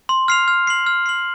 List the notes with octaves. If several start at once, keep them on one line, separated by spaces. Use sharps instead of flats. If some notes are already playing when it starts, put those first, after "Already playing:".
C6
F6 C7 F7
F6
C7 F#7
F6
C7 F#7